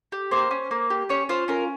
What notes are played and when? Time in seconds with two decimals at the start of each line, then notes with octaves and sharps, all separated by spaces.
0.12 G4
0.31 A#3 C5
0.51 C#4
0.71 A#3
0.90 G4
1.09 C#4 C#5
1.29 F4 C5
1.48 C#4 A#4